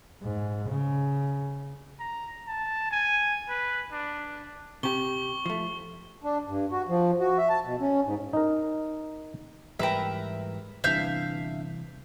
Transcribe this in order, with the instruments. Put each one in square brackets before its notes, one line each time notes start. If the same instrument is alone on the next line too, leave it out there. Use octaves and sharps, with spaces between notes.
[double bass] G#2
C#3
[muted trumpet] A#5
A5
G#5
B4
D4
[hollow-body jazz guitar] C3 G4 [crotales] C#6 G7
[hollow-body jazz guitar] F3 A3
[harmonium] D4
G2
F#4
F3
F#4
E5
A5
B2
C#4
G#2
[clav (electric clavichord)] D#4 A#4
[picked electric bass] G#2 E3 G3 [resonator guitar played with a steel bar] A#4 B4 G5 [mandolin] E5 A#5
[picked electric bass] G1 D4 [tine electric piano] C3 E3 G3 [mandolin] E5 F5 G6